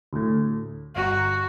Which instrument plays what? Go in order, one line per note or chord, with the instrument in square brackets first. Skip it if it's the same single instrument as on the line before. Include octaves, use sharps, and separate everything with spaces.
[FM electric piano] D2 A2
[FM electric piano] G1 A#5 [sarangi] F#4